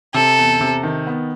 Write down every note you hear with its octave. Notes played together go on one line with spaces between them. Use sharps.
C3 A4
E2
C3
D#3
B3